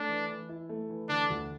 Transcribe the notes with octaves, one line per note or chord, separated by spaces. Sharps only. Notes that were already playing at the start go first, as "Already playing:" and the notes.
Already playing: A3 D4
E3
E3
E4
A3
E3
D3 D4
D2